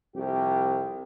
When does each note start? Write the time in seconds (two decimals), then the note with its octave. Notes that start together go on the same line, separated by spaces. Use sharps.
0.15 C2 F2 C3 G4